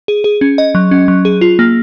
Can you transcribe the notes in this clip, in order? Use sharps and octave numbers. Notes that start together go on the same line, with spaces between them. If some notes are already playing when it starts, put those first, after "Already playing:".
G#4
G#4
C#4
D#5
F#3
C#4
F#3
G#4
F4
A#3